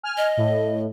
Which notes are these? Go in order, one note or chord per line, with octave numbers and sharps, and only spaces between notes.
G#5 F6
D#5
A2